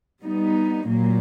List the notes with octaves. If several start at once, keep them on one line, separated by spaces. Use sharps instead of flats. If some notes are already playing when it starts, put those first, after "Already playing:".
G3 B3 D#4
A#2 F#3 A#3